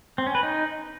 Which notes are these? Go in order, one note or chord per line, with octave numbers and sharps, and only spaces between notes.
C4
C#4
B4
D#4